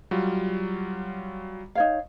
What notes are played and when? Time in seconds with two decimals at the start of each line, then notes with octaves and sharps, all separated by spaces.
0.11 F#3 G3 F4
1.75 D#4 C#5 F5